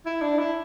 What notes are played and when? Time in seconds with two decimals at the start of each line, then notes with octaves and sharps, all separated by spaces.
0.06 E4
0.22 D4
0.38 E4